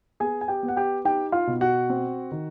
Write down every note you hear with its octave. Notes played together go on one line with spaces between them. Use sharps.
B3 G#4 G#5
G#5
G4 G5
B3
F#5
G4 G5
D#4 G4 G5
F4 F5
B2
F#4 F#5
C4
D#3